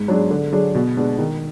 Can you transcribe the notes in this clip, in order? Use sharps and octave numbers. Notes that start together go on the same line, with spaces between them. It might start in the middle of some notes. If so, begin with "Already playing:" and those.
Already playing: G#2
F#3 D4 G#4
D3
F#3 D4 G#4
B2
G#3 B3 D4
D#3